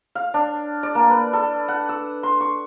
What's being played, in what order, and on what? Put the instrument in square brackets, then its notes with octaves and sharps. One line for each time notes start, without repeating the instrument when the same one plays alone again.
[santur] F5
D4
D5
A#3
B4
A4
F#5
E6
C6
C#6